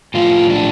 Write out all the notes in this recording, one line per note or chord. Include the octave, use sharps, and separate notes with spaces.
A2 F3 F4
D4